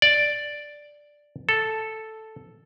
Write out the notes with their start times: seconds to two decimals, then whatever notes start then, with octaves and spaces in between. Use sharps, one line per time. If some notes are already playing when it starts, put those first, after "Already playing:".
0.02 D5
1.49 A4